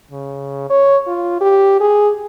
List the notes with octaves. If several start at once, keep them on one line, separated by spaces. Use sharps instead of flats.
C#3
C#5
F4
G4
G#4